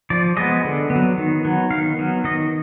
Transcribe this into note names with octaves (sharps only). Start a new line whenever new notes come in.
F3 D5
G#3 B3 D#5
D3
B3
F#3
D#3
F#3 B3
D#3 F5
F#3 B3
D#3 D#5